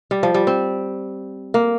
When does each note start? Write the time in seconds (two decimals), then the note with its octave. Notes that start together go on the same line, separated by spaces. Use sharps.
0.11 G3
0.23 F3
0.34 G3
0.47 C4
1.54 A#3